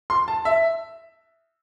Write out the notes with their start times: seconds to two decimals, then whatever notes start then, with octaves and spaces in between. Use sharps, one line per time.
0.10 C6
0.28 A5
0.45 E5